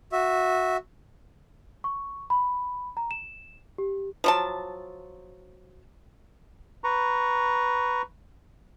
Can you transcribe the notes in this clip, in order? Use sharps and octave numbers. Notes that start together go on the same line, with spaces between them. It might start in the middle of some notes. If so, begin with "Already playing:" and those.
F#4 E5
C#6
B5
A#5
E7
G4
F3 F#3 A5
B4 A#5 C#6